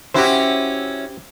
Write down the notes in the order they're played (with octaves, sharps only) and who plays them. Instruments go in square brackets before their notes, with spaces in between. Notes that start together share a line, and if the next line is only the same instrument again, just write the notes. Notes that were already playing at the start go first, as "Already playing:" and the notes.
[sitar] C#4 E4 F#4 [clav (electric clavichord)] G4 C5